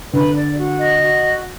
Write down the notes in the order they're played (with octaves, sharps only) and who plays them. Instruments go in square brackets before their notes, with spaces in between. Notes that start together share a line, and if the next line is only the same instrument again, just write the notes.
[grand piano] D3 [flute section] B4
[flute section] D5
F#4
D#5
F#4